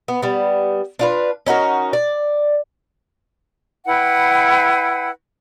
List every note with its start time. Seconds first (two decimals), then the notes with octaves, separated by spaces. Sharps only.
0.08 B3
0.22 G3 B3
0.99 D4 F4 B4
1.46 C#4 D#4 F#4 A#4
1.93 D5
3.86 E4 B4 F#5 G5